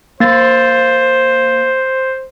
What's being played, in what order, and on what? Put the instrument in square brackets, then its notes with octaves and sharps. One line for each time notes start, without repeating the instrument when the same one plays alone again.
[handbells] A#3 A6 [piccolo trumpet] C5